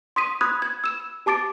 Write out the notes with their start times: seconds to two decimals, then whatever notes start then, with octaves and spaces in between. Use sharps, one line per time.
0.16 C6 D#6 B6 D#7
0.41 B5 D#6 F#6 G#6
0.62 G#6
0.84 E6 E7
1.26 G4 A5 D6 A6 D7